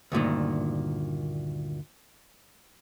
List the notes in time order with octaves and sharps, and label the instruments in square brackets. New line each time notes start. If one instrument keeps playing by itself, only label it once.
[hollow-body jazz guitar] D2 G2 A#2 D#3